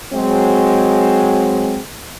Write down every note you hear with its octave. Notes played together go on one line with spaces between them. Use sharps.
F#3 G#3 C4